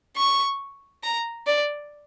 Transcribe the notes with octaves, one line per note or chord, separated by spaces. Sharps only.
C#6
A#5
D5